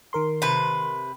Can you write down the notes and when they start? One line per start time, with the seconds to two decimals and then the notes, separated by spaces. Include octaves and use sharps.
0.13 D#3 A#4 C6
0.42 C3 B4